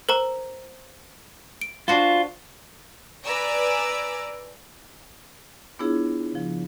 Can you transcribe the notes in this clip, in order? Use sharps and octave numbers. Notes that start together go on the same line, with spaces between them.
A#4 C5 A#5
D7
D4 F4 F#4 C5
B4 D5 G#5 A#5 D6 E6
B3 D4 E4 F4 G#4 C#5
C#3 F3